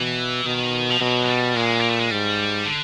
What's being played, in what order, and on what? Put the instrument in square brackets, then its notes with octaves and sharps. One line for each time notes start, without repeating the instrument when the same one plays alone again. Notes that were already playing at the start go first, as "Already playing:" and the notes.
Already playing: [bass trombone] B2 [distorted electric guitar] E3
[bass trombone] B2 [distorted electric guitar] D#3
[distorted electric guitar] F3
[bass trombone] B2 [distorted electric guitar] F#3
[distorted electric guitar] G#3
G3
[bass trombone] A#2 [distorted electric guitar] G#3
[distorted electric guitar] A#3
A3
G#3
[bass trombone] G#2 [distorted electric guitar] G3
[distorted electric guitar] D3